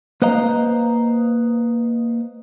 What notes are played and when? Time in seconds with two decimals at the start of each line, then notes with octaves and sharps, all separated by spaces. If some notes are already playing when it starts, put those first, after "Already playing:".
0.22 A#3 B4 C5 D#5 F5 A#5